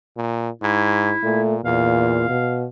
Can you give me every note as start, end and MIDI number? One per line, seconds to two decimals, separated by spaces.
0.17 0.49 46
0.62 1.14 44
0.62 1.41 64
1.23 1.62 46
1.23 1.55 57
1.65 2.28 40
1.65 2.25 46
1.65 2.66 77
2.29 2.66 47